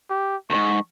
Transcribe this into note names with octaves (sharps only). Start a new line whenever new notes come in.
G4
D2 G#2 C#6